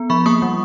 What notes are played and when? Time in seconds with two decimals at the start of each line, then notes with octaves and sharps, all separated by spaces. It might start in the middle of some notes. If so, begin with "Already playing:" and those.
Already playing: B3
0.10 F3 B5 C#6
0.26 A#3 C#6 D#6
0.42 G3